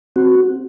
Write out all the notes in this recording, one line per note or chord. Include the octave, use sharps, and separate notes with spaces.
C4 F#4